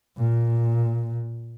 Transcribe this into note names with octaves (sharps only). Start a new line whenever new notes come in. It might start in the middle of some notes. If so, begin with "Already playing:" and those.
A#2